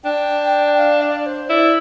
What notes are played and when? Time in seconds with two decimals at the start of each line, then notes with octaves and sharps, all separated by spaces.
0.04 D4 G5
0.78 F5
1.02 D5
1.26 C5
1.49 E4 D5